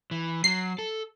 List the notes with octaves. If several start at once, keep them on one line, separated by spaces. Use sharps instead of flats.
E3
F#3 C7
A4